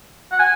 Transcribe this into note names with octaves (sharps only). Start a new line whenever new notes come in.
F#5
G#5